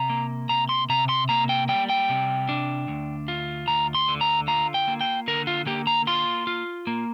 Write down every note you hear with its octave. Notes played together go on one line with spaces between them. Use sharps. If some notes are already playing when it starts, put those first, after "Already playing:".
Already playing: C3 A#5
A#3
C3 A#5
C6
C3 A#5
C6
A#3 A#5
G5
G3 G5
G5
C3
D4
D2
F4
D2 A#5
C6
D3
A#5
F4 A#5
G5
A#3
G5
D3 A#4
F4
A#3 G4
A#5
F4 C6
F4
A#3